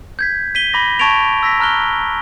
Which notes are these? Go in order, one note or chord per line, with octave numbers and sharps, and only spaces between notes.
G6 G#6 B6
B6 D#7 G7
B5 D6 A#6
A5 C#6 G#6 A6 D7 F7
E6 A#6 B6
A#5 F6 F#6 G7